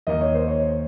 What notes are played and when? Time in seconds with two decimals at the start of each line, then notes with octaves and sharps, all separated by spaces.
0.07 D#2 D#3 A#3 D#5
0.21 C#5
0.34 C5
0.48 C#5